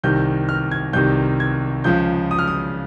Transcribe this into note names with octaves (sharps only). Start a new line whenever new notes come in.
C2 C3 D#3 G6
F6
G#6
C2 C3 D#3 G6
G#6
C#2 C#3 F3 G6
D#6
F6
D#6